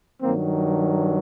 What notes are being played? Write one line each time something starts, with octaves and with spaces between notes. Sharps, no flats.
G2 D#3 F#3 A#3 C4